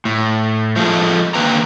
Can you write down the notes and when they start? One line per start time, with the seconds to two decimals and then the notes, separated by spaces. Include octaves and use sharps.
0.05 A2
0.76 F3 G#3 A4
1.34 D3 D#3 A#3 B4 G5 A#5